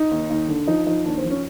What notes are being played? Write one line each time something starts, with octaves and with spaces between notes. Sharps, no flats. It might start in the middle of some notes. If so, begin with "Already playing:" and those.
Already playing: D#4
D#2
D#2
D3
F3 D#4
F3 D#4
D#2 D4
C4
F3
C#4